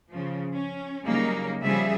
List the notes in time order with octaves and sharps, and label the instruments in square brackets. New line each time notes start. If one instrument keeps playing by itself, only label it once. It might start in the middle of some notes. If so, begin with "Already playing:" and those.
[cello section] C#3 F3
C#4
C#3 F#3 G3 A#3 D#4
C#3 F3 G3 G#4 E5